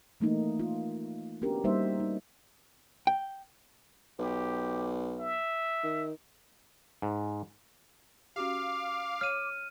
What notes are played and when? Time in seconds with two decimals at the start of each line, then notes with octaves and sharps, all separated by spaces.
0.20 E3 A3 A#3 D#4
0.60 F4
1.42 B3 C#4 D4 F#4 G4 A#4
1.64 G3 A#3 D#4 C5 E5
2.00 D#4
3.07 G5
4.19 B1 G4
5.19 E5
5.84 D#3
7.02 G#2
8.36 C#4 F#4 G4 F5 D6
9.21 C#5 F6 D#7